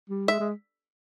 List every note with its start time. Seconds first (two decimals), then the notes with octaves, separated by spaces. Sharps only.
0.10 G3
0.28 G#3 E5
0.40 G#3